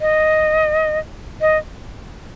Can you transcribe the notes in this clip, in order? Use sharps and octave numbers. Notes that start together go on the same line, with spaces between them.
D#5
D#5